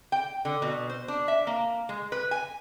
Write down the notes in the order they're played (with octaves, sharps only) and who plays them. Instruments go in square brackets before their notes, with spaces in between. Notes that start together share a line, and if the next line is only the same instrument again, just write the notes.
[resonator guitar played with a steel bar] G5
D3
B2
C5
D4
E5
A#3
G#3
B4
G#5